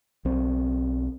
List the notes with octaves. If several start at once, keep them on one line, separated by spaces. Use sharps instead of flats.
B1 C4